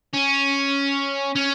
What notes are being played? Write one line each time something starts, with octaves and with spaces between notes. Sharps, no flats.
C#4
C#4